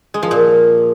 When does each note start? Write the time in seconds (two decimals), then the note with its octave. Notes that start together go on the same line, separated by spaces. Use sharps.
0.14 G#3
0.23 F3
0.31 A#2